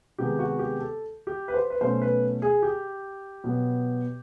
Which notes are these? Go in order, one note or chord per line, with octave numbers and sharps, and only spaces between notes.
C3 D#3 G#3 B3 G4
F#4
G4
A4
G4
B4
C5
B4
B2 F#3 A3 C#4 C5
B4
G#4
G4
B2 F#3 B3